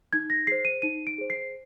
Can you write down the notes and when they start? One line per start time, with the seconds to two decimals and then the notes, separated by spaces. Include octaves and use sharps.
0.13 D#4 G#6
0.30 A#6
0.47 G#4 C5 C7
0.65 D#7
0.82 D#4 D#7
1.07 D7
1.18 G#4 C5
1.30 C7